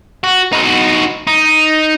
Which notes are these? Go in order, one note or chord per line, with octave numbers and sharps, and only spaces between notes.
F#4
D#4 F#4
D#4